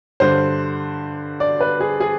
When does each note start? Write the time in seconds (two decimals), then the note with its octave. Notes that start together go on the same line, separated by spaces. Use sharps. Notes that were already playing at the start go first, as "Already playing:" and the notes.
0.20 G2 D3 C5
1.40 D5
1.60 B4
1.80 G#4
2.00 G#4